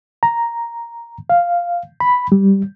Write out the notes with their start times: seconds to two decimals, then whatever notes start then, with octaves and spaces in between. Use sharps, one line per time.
0.23 A#5
1.30 F5
2.00 B5
2.32 G3